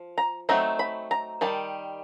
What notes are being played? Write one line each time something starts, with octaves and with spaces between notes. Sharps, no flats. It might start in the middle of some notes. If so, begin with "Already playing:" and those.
Already playing: F3
A#5
F#3 A3 C4 D#4 A#5
B5
A#5
D#3 G3 A5